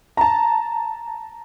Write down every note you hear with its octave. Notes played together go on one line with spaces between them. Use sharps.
A5 A#5